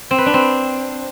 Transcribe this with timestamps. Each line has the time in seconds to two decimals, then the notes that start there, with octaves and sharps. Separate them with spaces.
0.11 C4
0.18 B4
0.26 D4
0.34 C4